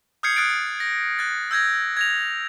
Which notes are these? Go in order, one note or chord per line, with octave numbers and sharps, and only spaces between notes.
D#6 F6 G6 G#6 C7 C#7
D#6 F6 F#6 A6 C7 D7
A#6
F#6 A6
E6 G6 G#6 A#6
G#6 A#6 F7